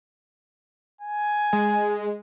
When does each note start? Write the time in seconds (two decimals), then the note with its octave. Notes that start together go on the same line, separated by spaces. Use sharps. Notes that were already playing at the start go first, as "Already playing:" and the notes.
1.01 G#5
1.53 G#3